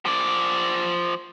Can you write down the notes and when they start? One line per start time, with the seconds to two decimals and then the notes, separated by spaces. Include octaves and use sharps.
0.05 F3 D5